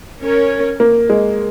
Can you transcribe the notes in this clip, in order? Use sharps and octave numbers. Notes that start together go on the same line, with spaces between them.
C#4 A#4 C#5
A#3
G#3